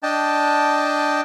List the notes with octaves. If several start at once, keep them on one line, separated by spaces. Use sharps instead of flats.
D4 D#5 G5 A5